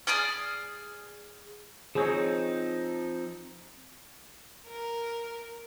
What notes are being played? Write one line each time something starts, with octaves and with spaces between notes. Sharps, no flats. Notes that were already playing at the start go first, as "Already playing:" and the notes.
G#4 D5 D#6 F6
F3 C4 D#4 G#4 C#5
A#4